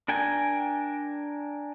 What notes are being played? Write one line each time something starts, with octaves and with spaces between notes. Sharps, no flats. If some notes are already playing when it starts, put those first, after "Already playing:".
D4 A#4 G5 G#5